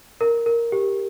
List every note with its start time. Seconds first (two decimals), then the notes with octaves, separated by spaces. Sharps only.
0.21 A#4
0.46 A#4
0.72 G4